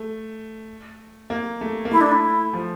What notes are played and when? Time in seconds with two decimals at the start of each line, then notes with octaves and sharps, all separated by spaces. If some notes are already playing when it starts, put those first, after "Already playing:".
Already playing: A3
1.30 A#3
1.61 A3
1.85 A#3
1.92 A3 E4
2.01 D4
2.12 E4
2.53 F3